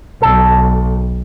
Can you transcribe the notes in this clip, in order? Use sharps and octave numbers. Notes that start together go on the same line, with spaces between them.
B1 A4